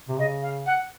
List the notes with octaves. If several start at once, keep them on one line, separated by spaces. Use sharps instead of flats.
C3
C#3 D#5
F5
F#5